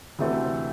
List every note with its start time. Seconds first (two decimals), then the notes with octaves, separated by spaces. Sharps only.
0.19 D2 C3 E3 A3 C4